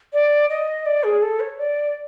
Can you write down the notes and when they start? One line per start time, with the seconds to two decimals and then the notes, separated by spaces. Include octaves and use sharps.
0.13 D5
0.50 D#5
0.86 D5
1.04 G#4
1.22 A4
1.40 C#5
1.58 D5